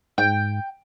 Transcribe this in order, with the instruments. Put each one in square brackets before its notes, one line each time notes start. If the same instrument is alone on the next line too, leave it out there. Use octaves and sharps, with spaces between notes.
[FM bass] G#2 [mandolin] G5